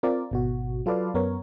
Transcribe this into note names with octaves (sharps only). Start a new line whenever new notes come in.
C4 F4 A#4 D5
G#1 B2 F#4
F#3 F4 A4 B4 D5 F5
F#2 B3 A#4 C#5